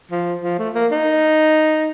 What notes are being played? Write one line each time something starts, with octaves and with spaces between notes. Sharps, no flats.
F3
F3
A3
A#3
D#4